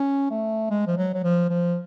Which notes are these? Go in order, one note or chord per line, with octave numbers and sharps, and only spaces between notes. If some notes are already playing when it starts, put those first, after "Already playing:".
Already playing: C#4
A3
G#3
F3
F#3
F#3
F3
F3